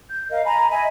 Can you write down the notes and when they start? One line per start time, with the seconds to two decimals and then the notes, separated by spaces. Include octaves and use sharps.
0.09 G6
0.30 A#4 D#5 F5
0.44 G#5 A#5 B5
0.70 D#5 E5 G#5 B5